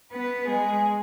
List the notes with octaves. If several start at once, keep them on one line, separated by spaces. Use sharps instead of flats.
B3 B4
G#3 G#4